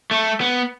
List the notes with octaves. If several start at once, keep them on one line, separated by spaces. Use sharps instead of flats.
A3
B3